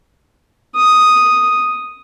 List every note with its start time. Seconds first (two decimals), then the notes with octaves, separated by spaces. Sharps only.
0.75 D#6